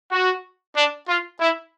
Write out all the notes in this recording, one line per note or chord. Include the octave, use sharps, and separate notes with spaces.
F#4
D4
F4
E4